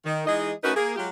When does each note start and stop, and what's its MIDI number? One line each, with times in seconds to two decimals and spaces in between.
0.05 0.26 51
0.26 0.51 52
0.26 0.51 56
0.26 0.51 63
0.26 0.51 68
0.26 0.51 75
0.64 0.71 57
0.64 0.71 61
0.64 0.71 63
0.64 0.71 66
0.64 0.71 70
0.64 0.71 71
0.75 0.92 58
0.75 0.92 68
0.96 1.08 54
0.96 1.08 56
0.96 1.08 65
0.96 1.08 67